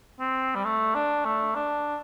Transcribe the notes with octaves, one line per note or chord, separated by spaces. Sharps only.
C4
G3
A3
D4
A3
D4